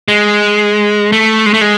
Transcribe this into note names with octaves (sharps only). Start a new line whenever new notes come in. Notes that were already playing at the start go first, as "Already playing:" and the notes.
G#3
A3
G#3
A3
G#3